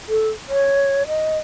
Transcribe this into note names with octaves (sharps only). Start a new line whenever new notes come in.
A4
C#5
D#5